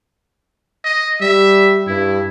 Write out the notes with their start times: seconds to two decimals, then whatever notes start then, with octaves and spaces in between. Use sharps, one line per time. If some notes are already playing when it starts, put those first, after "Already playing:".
0.84 D#5
1.21 G3 E5
1.87 G2 E4